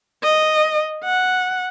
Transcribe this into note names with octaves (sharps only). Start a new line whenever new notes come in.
D#5
F#5